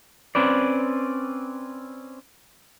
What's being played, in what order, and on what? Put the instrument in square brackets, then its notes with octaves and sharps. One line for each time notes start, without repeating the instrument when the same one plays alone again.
[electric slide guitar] C4 C#4 B4 D5